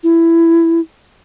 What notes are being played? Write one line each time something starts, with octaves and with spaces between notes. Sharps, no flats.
E4